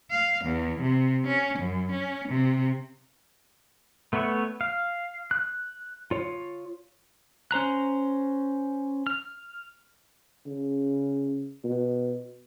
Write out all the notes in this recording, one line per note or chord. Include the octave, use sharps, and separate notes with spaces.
F5
E2
C3
C#4
F#2
C#4
C3
A3 B3 B4 C#5 E5
F5
F#6
F4 C#5
C#4 C5 A#5 F#6
F6
C#3
B2